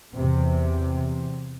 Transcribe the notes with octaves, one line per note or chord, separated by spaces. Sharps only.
E2 C3